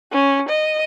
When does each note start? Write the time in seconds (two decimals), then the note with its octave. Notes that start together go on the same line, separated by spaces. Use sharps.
0.12 C#4
0.49 D#5